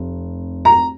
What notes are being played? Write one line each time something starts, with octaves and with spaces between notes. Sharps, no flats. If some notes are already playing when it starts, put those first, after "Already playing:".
Already playing: F1
A#5